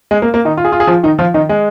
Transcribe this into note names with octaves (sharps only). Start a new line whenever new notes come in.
G#3
A#3
A#3
D#3 D#4
F4
G#4
F4
G#4
F3 F4
D#3 D#4
F3 F4
D#3 D#4
G#3